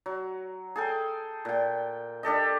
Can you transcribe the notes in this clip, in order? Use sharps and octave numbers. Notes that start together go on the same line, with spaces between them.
F#3
G#4 A4 G5
A#2 G5
D4 G4 A4 D#5